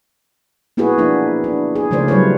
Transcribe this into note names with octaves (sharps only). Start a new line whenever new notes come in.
A#3 B3 E4 F#4 G#4 B4
F3 A#3 D4 E4
D4
G#4
C#3 F3 A3 A#4 C5 D5
F#3 G3 E4 F4 B4 C#5